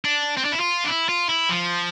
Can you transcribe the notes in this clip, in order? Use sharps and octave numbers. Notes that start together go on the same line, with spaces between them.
D4
C4
D4
E4
F4
D4
E4
F4
E4
F3